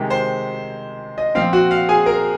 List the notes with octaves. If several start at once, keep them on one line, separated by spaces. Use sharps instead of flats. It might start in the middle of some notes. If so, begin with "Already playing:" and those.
Already playing: C3 D#3 G#3
C5 C6
D#5
A#2 F3 C4 F5
F#4 F#5
F5
G#4 G#5
A#4 A#5